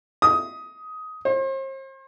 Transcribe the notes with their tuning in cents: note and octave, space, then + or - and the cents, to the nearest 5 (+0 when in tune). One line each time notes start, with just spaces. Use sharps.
D#6 +15
C5 +40